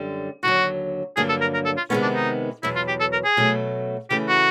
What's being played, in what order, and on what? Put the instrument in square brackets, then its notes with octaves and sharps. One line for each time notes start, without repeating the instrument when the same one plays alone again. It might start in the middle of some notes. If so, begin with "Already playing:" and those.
Already playing: [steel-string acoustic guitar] F#2 D3 G3
[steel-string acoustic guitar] D#2 D3 F#3 [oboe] F#4
[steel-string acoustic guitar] G2 D3 F#3 A#3 [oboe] G#4
[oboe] A4
A#4
A#4
A4
F4
[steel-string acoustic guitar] C3 D#3 G#3 B3 [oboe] C#4
[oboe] D4
D#4
[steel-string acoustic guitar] E2 B2 F#3 [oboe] E4
[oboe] F4
G4
A4
A#4
G#4
[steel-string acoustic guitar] B2 F#3 A3
[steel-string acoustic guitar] C#3 E3 A3 [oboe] G4
[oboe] F#4